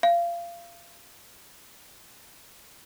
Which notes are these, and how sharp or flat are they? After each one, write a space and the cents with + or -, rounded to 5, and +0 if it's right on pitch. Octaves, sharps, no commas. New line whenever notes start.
F5 -25